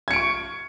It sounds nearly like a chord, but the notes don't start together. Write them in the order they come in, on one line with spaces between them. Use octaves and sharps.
G#6 C#7 D7 C#6